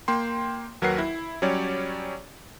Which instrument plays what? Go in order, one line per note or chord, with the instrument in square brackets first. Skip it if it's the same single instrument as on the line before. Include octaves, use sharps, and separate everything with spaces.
[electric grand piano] A#3 G5 C6
D#2 F#3 A#4 B4 F#5 C7
E4
F#3 G3 C#4 G4 C#5 D5